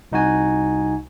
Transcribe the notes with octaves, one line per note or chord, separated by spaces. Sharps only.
C2 D#4 F#4 G#5